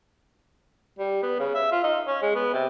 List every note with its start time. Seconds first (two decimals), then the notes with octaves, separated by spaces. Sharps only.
0.99 G3
1.23 B3
1.39 C#3
1.55 E5
1.72 F4
1.84 D#4
2.07 C#4
2.22 G#3
2.35 B3
2.54 C3